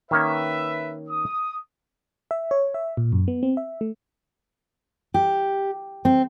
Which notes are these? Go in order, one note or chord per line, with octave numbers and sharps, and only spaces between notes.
D#3 A#3 C#4 B4 E5
D#6
E5
C#5
E5
A#2
F#2
B3
C4
E5
A3
G4
C4